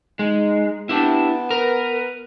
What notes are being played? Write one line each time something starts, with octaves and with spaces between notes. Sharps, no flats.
G#3 D#4
B3 D4 E4 G4
A#4 B4